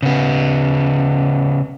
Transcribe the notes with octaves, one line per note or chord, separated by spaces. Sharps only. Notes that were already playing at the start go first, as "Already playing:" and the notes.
C#3 B3